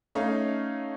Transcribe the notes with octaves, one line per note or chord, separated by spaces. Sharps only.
A3 C#4 D#4 C#5 F5